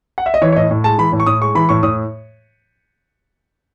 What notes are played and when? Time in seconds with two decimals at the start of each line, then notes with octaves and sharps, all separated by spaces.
0.18 F#5
0.26 E5
0.34 D#5
0.41 E3 C#5
0.52 C#5
0.56 A2 D#5
0.71 A2
0.84 G#3 A5
0.98 E3 B5
1.12 A2
1.20 C#6
1.26 A2 D#6
1.41 G#3 C#6
1.55 E3 B5
1.69 A2 C#6
1.83 A2 D#6